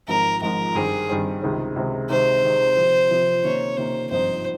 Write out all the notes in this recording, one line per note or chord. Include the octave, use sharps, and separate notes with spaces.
G#1 G#2 F3 A#4
G#1 G#2 F3 A#4
G2 D#3 G3 C4 G4 G#4
G2 D#3 G3 C4 G4
C#2 C3 D#3 G#3 C4
C#2 C3 D#3 G#3 C4
C3 D#3 G#3 C5
C3 D#3 G#3
C3 F3 C4
C3 F3 C4
C3 D#3 A#3 C#4 C#5
C3 D#3 A#3 C#4 C5
G#1 G2 F3 C4 D#4 C5